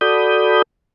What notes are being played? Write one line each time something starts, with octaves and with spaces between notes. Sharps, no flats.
F#4 A4 D5 B5 D#6 G6